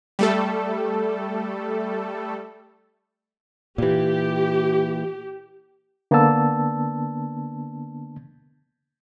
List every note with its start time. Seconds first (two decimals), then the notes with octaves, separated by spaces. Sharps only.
0.19 G3 A3 A4
3.78 A#2 E3 G4
6.11 D3 A#3 B3 D4 A5 E6